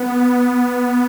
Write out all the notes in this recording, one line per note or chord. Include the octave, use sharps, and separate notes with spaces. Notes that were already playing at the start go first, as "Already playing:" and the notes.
Already playing: B3